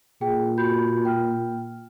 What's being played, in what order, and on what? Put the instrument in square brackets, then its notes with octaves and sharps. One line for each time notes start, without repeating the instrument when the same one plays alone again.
[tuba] A#2 [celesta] G#4 G5
[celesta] F#4 B5 G6
G5 F6